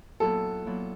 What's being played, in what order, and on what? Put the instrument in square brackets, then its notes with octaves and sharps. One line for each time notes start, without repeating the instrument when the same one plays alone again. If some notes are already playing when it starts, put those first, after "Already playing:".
[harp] A#2 F#3 B3 E4 [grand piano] A4
[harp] A#2 F#3 B3 E4